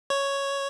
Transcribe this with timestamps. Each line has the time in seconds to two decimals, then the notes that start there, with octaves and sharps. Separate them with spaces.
0.10 C#5